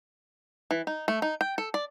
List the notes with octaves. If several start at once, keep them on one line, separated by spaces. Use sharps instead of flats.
E3
D#4
A3
D#4
G5
A4
D5